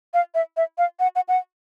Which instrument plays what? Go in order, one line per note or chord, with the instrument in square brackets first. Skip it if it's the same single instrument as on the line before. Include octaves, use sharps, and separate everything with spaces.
[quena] F5
E5
E5
F5
F#5
F#5
F#5